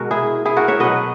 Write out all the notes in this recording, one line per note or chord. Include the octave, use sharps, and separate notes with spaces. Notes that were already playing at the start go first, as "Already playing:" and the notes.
Already playing: B2 G#3 F#4 A#4
E4 G#4
E4 G#4
F#4 A#4
C#5 E5
B2 F#3 B4 D#5